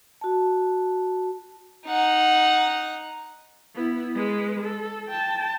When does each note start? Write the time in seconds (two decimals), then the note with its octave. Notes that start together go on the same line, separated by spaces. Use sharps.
0.21 F#4 A5
1.86 D#4 F#5
3.75 B3 E4
4.15 G#3 B4
4.62 A4
5.08 G5 A5